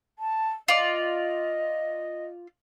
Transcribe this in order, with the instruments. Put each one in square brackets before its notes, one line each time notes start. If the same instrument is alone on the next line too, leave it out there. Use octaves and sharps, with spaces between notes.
[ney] A5
[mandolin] F4 D5 [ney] D#5